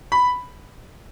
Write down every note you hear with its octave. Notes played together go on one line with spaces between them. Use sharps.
B5